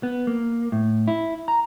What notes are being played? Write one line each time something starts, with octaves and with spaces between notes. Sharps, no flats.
B3
A#3
A2
E4
A#5